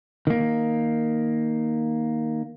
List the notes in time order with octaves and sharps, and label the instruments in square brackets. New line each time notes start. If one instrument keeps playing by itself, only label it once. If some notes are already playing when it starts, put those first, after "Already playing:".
[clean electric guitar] D#3 A#3